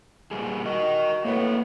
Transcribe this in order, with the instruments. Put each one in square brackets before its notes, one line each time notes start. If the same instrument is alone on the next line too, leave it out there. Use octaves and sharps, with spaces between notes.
[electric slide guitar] A#2 G3 G#4
[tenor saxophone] F#4 [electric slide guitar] A#4 D#5
[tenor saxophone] A2 [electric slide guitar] A#3 B4